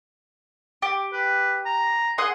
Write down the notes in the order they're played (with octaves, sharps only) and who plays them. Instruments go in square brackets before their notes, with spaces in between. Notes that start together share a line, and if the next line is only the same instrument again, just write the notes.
[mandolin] G4
[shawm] B4
A#5
[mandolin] G#4 F#5 D#6 [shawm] C6